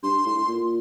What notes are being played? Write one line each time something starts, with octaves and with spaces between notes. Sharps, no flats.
G2 C6
A2
A#2